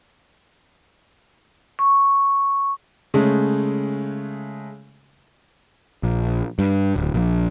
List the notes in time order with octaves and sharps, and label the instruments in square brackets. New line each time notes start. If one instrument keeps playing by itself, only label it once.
[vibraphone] C#6
[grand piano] C#3 G#3 A3
[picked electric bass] A#1
G2
D1
A#1